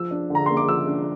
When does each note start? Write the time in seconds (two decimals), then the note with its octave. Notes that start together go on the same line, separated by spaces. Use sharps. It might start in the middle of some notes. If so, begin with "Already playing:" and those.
Already playing: F3 E6
0.11 D4
0.30 D3 A#5
0.46 A#3 C6
0.57 D6
0.68 F3 E6
0.87 D4